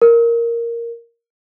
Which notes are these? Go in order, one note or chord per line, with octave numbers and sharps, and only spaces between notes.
A#4